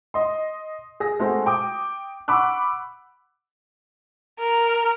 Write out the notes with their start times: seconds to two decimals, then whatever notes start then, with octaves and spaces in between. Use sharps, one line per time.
0.14 D#5 C6
1.00 G#4 A#6
1.19 G#3 A3 C4 F#4
1.46 G5 D6 D#6
2.28 F#5 B5 C#6 D6 E6 F#6
4.39 A#4